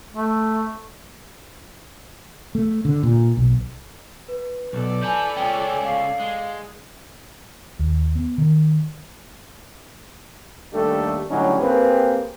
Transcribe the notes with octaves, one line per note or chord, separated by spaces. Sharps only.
A3
A3
D3
A#2
B1
B4
B1 A4 D5
E4 B4 G#5 A5 G6
G#3 C#4 G5
F5 C7
G#3
D#2
B3
D#3
D#2 G3 A3 D4 G4 A4
A2 D3 F#3 G3 C#4 D#4
A#3 C4 G4 G#4 B4